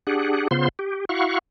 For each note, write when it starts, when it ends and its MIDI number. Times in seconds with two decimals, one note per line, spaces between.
0.07 0.48 62
0.07 0.48 67
0.07 0.48 68
0.07 0.48 78
0.51 0.69 49
0.51 0.69 59
0.51 0.69 65
0.51 0.69 72
0.51 0.69 84
0.79 1.05 67
1.09 1.39 64
1.09 1.39 66
1.09 1.39 77
1.09 1.39 78
1.09 1.39 85